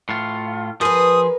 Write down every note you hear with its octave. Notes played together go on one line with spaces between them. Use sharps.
A2 F4
F3 G#4 A#4 B4 D#6